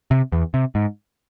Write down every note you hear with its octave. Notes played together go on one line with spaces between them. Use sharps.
C3
E2
C3
G#2